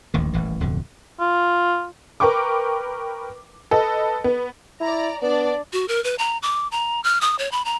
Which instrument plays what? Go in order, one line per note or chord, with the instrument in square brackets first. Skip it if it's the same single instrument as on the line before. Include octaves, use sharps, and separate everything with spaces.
[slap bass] D1 A1 D#2 D#3
D#1 A1 E3
D1 F2 B2 D3
[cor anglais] F4
[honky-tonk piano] A#4 B4 G5 C#6 D6
A4 B4 D#5
B3
[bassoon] E4 [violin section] D5 A#5
[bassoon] B3 [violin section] D4 D5
[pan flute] F#4
A#4
B4
A#5
D6
A#5
F6
D#6
C#5
B5
A#5